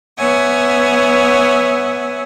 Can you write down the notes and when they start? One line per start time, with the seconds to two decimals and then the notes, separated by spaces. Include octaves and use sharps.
0.18 B3 C#5 E5 F#5 G#5